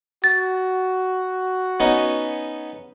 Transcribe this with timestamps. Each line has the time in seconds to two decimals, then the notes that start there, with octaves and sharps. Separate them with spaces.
0.24 F#4 A6
1.80 B3 C#4 D#4